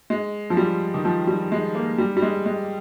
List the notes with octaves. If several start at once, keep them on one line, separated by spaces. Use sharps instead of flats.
G#3
F3
G3
D#3
F3
G3
G#3
A#3
G3
G3
G#3
G#3